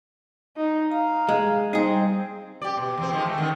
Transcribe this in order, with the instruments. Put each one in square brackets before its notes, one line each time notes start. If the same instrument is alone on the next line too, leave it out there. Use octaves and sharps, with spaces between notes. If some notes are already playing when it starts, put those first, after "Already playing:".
[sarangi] D#4
[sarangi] F5 [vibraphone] A#5
[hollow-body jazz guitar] G#3
[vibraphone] G3 [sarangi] C4 [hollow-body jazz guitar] D#4 G#4
[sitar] G4 D5
B2
E2 F3 C4
D#3 F3 G#3
A3
D3 D#3